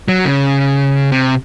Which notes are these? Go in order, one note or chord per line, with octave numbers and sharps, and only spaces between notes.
F#3
C#3
C3